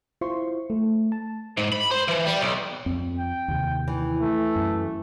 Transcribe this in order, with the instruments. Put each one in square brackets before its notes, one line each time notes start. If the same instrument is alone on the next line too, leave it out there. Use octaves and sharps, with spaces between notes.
[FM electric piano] E4 F4 C5 C6 C#6
A3
A5
[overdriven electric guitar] G#2
B5
C5
E3
G3
B1
[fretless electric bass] F2 C4
[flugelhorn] G5
[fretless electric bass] D#2 C3
[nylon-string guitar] E3
[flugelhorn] A3
[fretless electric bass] F#2